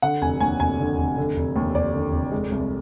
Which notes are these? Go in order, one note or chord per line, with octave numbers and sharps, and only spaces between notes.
D3 F#5
F1 G#5
D#2 G#5
F1 G#5
D3
F1
D3
F1
D#2
F1 D5
D3
F1
G#3
C2